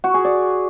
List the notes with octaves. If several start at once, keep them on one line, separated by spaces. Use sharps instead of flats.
F#4
G#4
D5